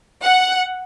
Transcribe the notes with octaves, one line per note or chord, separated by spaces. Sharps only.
F#5